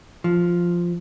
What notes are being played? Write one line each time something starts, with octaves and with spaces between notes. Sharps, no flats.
F3